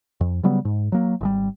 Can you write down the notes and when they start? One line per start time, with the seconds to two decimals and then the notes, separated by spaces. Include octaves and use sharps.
0.21 F2
0.43 C#3 F#3 G3 B3
0.65 G#2
0.92 F#3 A#3
1.21 G#1 D#3 G3